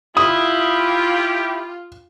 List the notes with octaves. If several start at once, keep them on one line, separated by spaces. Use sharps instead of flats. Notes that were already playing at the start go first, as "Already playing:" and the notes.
E4 F4 G4 D#6